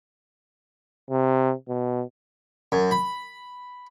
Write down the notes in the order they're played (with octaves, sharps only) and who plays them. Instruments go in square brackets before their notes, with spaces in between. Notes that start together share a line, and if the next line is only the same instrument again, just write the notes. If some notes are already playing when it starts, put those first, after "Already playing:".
[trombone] C3
B2
[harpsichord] F#2
B5